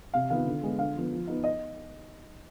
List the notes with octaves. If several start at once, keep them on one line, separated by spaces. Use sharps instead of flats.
C3 F5
D#3 B3 F4 F5
D3
G#3 B3
D3 F5
F3 B3
F3
B3 D#4
D#5